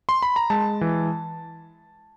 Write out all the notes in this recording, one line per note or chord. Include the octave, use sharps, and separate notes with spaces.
C6
B5
A#5
G#3 A5
E3